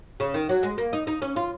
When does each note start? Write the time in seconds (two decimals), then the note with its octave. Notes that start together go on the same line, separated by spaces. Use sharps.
0.20 C#3
0.34 D#3
0.49 F#3
0.63 G#3
0.78 A#3
0.93 D#4
1.07 D#4
1.22 C#4
1.36 F4